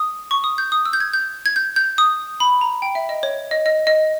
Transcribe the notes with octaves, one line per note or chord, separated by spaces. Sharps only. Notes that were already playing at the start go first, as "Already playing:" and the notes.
Already playing: D#6
C#6
D#6
G6
D#6
E6
G6
G#6
G6
G#6
G6
G6
D#6
B5
A#5
G5
E5
D#5
C#5
D#5
D#5
D#5